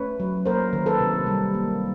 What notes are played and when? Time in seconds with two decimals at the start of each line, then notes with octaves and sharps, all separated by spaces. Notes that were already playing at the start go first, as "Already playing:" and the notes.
Already playing: A3 C#4 B4 C#5
0.20 F#3
0.45 A#3 A#4 C5
0.73 D#3
0.86 A4 B4
1.00 C3
1.27 G3
1.54 A#3